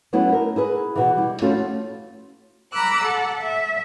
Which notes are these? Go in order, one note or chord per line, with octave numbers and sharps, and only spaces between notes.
F#3 A3 B3 C#4 E4
A#4
E4 G#4 B4
B2 E3
G3 E4
F3 A3 C4 C#4 F4 F#4
A#5 B5 D6 E6 F#6
A4 F#5
E5